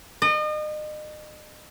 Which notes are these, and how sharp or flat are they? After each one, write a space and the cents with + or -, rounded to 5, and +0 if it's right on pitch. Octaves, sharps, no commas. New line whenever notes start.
D#5 -35